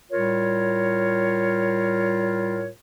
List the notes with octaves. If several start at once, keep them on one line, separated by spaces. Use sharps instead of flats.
A2 G3 F4 A#4 C#5